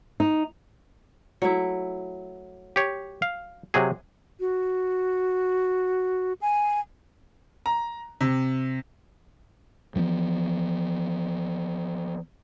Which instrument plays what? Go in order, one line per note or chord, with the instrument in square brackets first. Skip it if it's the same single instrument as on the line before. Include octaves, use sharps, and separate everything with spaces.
[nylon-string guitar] D#4
[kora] F#3 A3 E4
[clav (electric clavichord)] G4 C#5
F5
C3 F#3 G#4
[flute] F#4
G#5
[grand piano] A#5
C3
[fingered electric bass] E3 F3 A#3 B3